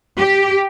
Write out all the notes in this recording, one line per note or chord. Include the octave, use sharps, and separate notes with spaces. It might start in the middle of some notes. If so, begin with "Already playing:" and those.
G4